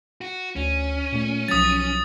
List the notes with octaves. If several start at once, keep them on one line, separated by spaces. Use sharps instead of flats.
F#4
D2 C#4
A#2 A3
B1 F3 F#3 D#6 A6